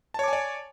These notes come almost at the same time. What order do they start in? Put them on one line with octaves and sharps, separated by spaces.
A5 C#5 D6 G#5 D5